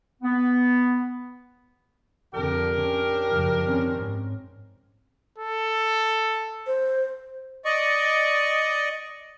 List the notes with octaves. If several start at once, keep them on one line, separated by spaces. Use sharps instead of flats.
B3
F2 D3 D4 G4 A#4
C#4
F#2 C#3 F3
D#3 C4 C#4
G#2
A4
C5
D5 D#5 C#6